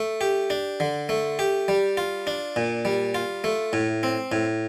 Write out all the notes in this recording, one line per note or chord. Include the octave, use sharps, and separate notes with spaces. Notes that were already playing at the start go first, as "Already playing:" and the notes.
Already playing: A3
G4
D4
D3
A3
G4
G3
F4
D4
A#2
G3
F4
A3
A2
C4
A2